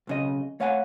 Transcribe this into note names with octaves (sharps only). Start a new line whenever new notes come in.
B1 C#3 D#5
A3 C#5 F5 F#5 G#5